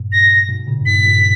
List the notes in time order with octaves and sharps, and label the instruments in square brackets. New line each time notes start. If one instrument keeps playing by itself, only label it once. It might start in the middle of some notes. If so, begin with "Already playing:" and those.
Already playing: [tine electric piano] G2 A#2
[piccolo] A#6
[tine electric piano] G#2 B2
A#2 C#3
G2
[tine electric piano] G#2 [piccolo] B6
[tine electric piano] G2 A#2